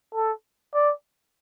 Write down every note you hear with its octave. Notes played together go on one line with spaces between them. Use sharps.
A4
D5